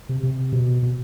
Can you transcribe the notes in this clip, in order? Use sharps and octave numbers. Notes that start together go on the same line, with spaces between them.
C3
C3
B2
B2